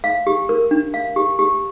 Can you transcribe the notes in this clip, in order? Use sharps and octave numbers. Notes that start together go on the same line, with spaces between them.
F5
G4
A#4
D4
F5
G4
G4